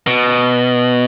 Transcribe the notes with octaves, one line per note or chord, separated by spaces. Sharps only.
B2